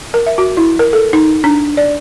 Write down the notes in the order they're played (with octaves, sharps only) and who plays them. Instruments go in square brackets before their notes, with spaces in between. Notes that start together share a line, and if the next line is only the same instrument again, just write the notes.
[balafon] A#4
E5
F#4
E4
A#4
A4
D#4
D4
D5